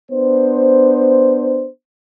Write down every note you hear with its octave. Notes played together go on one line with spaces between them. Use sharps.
B3 D4 C5